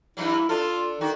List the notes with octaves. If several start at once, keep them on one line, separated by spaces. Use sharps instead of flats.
G2 E3 F#3 E4
D4 F4 A4
D#3 F#4